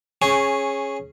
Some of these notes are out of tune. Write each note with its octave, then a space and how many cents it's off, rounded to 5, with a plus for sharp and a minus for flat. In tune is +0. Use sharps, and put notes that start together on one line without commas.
C#4 -15 G#4 +0 C#6 +0